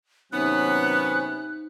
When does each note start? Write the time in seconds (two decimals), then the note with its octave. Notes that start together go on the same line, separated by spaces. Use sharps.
0.32 C3 D#3 F#3 B3 C#4 D#4 F#6